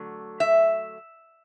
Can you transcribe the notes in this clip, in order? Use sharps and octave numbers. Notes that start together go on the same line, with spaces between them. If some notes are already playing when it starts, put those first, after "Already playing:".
Already playing: D3 F#3 A3
E5